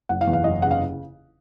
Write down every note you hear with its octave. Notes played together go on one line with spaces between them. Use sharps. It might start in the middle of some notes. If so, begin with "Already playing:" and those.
F#1 F#5
F5
E2
F5
F#1 D#5
C#3 F#5
F5